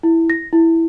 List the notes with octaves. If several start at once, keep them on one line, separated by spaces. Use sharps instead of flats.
E4
A#6
E4